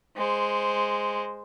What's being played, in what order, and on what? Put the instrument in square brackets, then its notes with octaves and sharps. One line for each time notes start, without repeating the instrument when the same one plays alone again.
[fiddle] G#3 C5